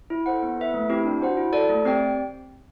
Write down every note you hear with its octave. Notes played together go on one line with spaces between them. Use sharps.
E4
A4 C5 F#5
B3
E4 B4 E5
A3
C4 E4 G4
D4
F#4 C5 F#5
E4
A4 D5 A5
A3
C4 G4 D5 G5